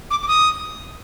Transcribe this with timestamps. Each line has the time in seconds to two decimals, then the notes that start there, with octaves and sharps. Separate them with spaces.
0.11 D6
0.23 D6
0.28 D#6